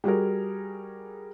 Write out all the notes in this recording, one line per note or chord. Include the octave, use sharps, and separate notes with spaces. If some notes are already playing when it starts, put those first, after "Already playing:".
G3 F#4 G#4 A#4